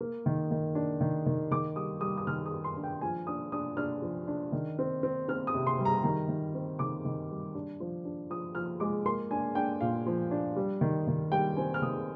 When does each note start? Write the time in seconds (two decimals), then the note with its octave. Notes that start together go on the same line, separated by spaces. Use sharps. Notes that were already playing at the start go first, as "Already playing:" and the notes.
0.01 A#3
0.26 D#3
0.51 D#3
0.75 D4
1.01 D#3
1.26 D#3
1.51 D#3 D6
1.76 G3 D#6
2.01 G3 D#6
2.17 D#6
2.27 D#3 F6
2.46 D#6
2.52 A#3
2.64 C6
2.77 D4
2.83 G5
3.01 F3 G#5
3.27 D4 D#6
3.52 D4 D#6
3.77 D4 F6
4.02 F3
4.28 D4
4.52 D#3
4.79 C4
5.03 C4
5.28 C4 F6
5.47 D#6
5.54 C3
5.67 C6
5.79 G3
5.85 A#5
6.04 D#3 A#5
6.29 D#3
6.54 C4
6.79 D#3 D6
7.05 D#3
7.30 G3
7.55 D4
7.80 F3
8.05 D4
8.30 F3 D#6
8.55 F3 F6
8.80 G#3 D6
9.05 A#3 C6
9.31 D4 G#5
9.55 D4 G5
9.81 A#2 F5
10.06 F3
10.31 D4
10.56 G3
10.81 D#3
11.07 D#3
11.32 G3 G5
11.57 C4 G#5
11.74 F6
11.82 D#3 D#6